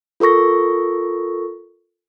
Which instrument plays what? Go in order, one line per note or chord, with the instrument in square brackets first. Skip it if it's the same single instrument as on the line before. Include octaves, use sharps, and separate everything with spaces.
[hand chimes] F4 A4 A#4 C#6 A#6